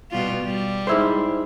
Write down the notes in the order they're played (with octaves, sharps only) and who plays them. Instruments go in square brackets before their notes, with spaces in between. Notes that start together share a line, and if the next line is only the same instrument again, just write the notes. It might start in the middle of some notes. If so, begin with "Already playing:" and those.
[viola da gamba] B2 G3 F4
G3
[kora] G#2 E4 C5